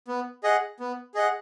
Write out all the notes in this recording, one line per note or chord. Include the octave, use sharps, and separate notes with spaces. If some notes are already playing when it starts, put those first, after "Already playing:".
B3
G#4 D#5 F#5
B3
G#4 D#5 F#5